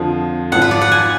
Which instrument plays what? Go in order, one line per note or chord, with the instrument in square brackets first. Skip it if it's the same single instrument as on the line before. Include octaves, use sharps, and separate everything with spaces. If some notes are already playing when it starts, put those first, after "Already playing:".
Already playing: [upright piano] F2 D3 F3
[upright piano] G#1 G#2 F3 [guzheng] F#5
[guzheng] B4
D5
F#5
G#5